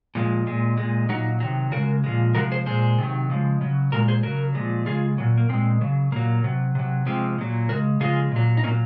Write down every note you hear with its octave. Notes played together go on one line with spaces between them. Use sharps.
A#2 F3 G#3
A#2 G#3
A#2 G#3
A#2 F#3 D#4 F#4
C3 D#3 F#3
C#3 G#3 F#4 A#4
A#2 F3 G#3
C3 F3 G#3 F#4 A#4
G#4 C5
A#2 G#3 G#4 C5
C3 D#3 F#3
C#3 F3 G#3
C#3 F#3
A#2 G#3 F#4 A#4
G#4 C5
C#3 F#3 F#4 A#4
A#2 F3 G#3
C#3 G#3 F4 G#4
A#2 F#3
A#3
A#2 G#3 C4
C#3 F#3
A#2 F#3 A#3
C3 F#3
C3 F#3
C3 F3 G#3 C4
A#2 F#3
C#3 G#3 F#4 A#4
C#3 F3 G#3 F4 G#4
A#2 F#3
D#4
A#2 F#3 A#3 C#4